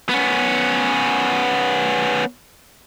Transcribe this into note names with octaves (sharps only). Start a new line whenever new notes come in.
B3 C#4